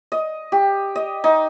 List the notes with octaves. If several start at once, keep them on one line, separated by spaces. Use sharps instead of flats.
D#5
G4
D#5
D#4